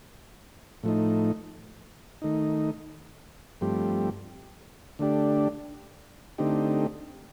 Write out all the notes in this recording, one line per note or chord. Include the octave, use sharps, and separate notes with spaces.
A2 F3 A3 D#4
D#3 A3 D#4
G2 F3 A3 C4 G4
D3 A3 D4 G4
D3 A3 C4 D#4 G4